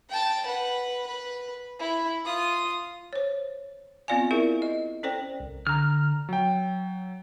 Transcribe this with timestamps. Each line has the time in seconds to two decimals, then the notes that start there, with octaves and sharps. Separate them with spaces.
0.10 G5 A5
0.46 B4 F#5
1.07 B4
1.79 E4
2.25 F4 D#6
3.13 C5 C#5
4.08 B3 C4 F4 D5 F5 G#5
4.31 E4 G#4 A#4 E5
4.62 D#5
5.03 C#4 A4 C5 D5 G5
5.40 C2
5.67 D3 A#5 F6
6.29 F#3 G5